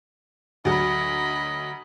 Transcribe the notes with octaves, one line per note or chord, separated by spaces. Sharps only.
D2 F#3 D#5 B5